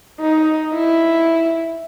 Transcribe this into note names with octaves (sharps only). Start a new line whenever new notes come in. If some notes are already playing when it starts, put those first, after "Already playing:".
D#4
E4